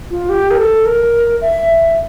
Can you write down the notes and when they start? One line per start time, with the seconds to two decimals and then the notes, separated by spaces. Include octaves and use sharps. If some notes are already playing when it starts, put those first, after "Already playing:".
0.11 F4
0.29 G4
0.51 A#4
0.58 A4
0.86 A#4
1.41 E5